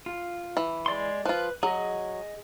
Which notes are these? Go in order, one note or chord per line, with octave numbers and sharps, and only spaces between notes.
F4
E3
G#3 D5 C6
F3 F4 B4
F#3 G#4 D#5